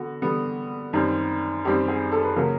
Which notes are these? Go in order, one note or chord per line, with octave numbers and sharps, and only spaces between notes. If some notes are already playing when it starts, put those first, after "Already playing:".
Already playing: D3 B3 F#4
D3 G3 B3
F#2 D#3 G3 C4
F#2 D#3 G3 C4 G4
G#4
A4
B4
C#3 F#3 A#3 A#4